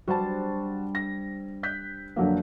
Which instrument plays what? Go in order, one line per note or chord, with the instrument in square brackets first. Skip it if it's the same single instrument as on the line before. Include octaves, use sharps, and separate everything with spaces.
[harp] G3 D4 C5 [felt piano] F#4 A5
[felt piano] A#6
F#6 G6 B6
[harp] F2 [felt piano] D3 F#3 A#3